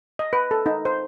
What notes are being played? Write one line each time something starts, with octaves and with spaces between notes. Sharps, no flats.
D#5
B4
A4
D#4
C5